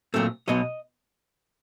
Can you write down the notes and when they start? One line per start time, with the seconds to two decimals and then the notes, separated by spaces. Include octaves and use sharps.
0.14 A#2 F#3 A3 C4
0.48 B1 B2 F#3 D#5